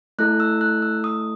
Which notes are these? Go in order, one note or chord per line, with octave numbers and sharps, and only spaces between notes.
A3 E4 A4 F#6
E6
F#6
E6
D#6